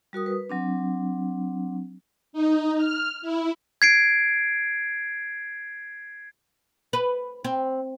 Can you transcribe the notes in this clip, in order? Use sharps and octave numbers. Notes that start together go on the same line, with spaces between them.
G3 F#4 A#4 D#6
B4
F#3 C4 D4
D#4
F6
E4
G#6 C7 D7
B4
C4